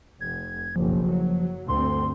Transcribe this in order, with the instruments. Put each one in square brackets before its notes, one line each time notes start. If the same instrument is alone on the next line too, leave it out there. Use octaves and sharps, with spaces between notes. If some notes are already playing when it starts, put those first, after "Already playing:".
[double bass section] F1 [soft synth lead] G#6
[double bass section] F#1 B1 [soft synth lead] F3
[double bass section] F#3
[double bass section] D2 G2 C4 [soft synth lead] C6